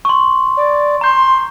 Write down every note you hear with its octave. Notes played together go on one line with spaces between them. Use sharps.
C6 C#6
D5
A#5 C6 G6